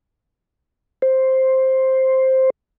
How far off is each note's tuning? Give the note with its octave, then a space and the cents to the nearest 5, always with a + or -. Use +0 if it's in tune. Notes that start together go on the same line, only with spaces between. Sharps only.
C5 +5